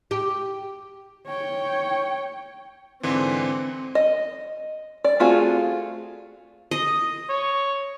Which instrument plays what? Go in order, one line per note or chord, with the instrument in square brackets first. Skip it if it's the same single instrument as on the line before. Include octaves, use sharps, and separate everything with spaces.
[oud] G4
[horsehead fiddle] C#5 G5
[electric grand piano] G#2 D3 E3 [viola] C4
[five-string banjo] D#5
D5
A3 C4 F4 F#4 G#4
[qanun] D#5
[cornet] C#5